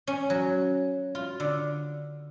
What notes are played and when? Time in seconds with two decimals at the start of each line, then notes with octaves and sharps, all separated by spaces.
0.07 C#4
0.30 F#3
1.15 F4
1.40 D3